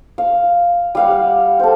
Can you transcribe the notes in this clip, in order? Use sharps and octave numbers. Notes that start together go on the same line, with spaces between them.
F5
G3 F5 F#5
A4 C5